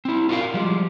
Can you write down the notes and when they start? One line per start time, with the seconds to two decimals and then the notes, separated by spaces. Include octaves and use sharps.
0.05 C4 E4
0.29 F4 F#4 A#4 E5 F5
0.54 F3 G3 G#3